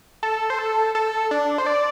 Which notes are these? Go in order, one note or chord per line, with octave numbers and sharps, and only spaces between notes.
A4
C5
A4
A4
D4
C5
D5